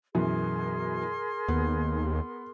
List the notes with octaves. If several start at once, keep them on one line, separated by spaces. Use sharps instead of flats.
F#2 B2 E3 G#4 A#4 C6
D#2 B3